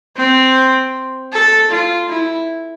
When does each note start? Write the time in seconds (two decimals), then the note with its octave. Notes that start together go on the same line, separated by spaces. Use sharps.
0.16 C4
1.32 A4
1.70 F4
2.09 E4